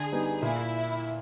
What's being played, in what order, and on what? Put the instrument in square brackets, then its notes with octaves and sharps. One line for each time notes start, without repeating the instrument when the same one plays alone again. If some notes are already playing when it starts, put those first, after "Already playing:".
Already playing: [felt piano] D3 [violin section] G#4
[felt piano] G3 B3 D#4
[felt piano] A#2 [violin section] E4